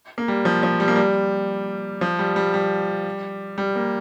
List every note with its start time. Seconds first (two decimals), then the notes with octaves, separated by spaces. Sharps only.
0.18 A#3
0.28 G3
0.45 F3
0.63 F3
0.80 G3
0.88 A#3
0.96 G3
2.01 F3
2.19 G3
2.36 G3
2.54 G3
3.58 G3
3.75 A#3